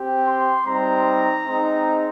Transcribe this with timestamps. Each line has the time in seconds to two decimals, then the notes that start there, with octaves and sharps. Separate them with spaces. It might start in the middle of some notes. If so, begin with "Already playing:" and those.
Already playing: C4 G4
0.28 C6
0.67 G3 C4 D#4 A#5
1.45 G#3 C4 D#4